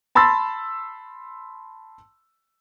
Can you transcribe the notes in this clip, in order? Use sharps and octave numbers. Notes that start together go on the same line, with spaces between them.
A5 B5 C6 E6 A6